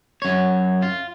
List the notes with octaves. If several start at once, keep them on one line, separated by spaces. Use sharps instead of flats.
F#2 C#5
F4